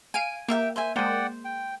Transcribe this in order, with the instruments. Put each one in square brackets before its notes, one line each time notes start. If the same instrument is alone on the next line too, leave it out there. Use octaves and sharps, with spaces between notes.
[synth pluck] F5 D7 D#7 [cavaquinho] G#5
[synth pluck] A#3 [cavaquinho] G4 E5 G5
[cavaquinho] C5 E5 G#5
[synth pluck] G#3 A#3 [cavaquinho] C5 [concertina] D5 F#5 G5
[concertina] G5